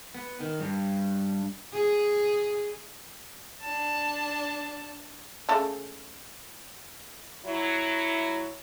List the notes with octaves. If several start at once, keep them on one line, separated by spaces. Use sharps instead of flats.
B3
D#3
G2
G#4
D4 A5
C#3 A3 A4
F#3 E4